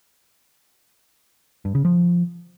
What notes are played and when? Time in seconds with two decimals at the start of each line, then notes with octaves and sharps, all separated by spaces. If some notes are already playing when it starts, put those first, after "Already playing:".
1.65 G2
1.75 C#3
1.85 F3